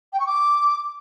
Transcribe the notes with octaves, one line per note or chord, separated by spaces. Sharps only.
G5
C#6
D6